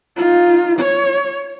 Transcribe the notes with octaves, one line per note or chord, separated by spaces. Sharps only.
D#4 F4
C#5